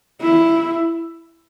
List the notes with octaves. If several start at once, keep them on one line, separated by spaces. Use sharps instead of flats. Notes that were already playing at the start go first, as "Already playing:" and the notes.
E4